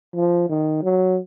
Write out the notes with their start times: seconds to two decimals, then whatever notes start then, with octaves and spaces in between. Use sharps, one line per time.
0.15 F3
0.49 D#3
0.83 F#3